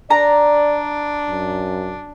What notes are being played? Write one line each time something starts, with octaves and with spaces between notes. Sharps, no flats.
D4 D5 A#5
F#2